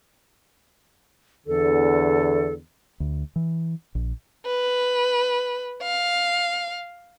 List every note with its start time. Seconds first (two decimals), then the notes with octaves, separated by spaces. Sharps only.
1.47 E2 D3 A4
3.00 D2
3.36 E3
3.95 A#1
4.46 B4
5.82 F5